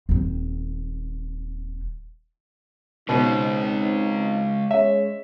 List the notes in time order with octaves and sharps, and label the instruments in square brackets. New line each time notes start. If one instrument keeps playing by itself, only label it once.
[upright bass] D#1 C4
[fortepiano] B2 [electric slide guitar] G#3 C#4 [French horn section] C4 D#4
[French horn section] G#3 C#4 C#5 [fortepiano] E5